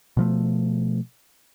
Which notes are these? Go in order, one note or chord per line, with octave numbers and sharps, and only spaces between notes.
B2 F3 A3